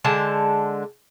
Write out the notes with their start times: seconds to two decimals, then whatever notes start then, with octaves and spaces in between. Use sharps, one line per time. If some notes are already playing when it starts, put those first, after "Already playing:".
0.05 D3 G#3 A5